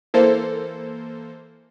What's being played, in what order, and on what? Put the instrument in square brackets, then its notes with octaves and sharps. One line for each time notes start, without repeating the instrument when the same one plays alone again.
[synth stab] E3 A#3 A4 C5